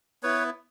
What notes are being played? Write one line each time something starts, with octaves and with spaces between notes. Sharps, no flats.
B3 E4 B4 C#5